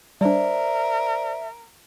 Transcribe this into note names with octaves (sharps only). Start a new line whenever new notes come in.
G3 D4 A#4 C5 D5 E5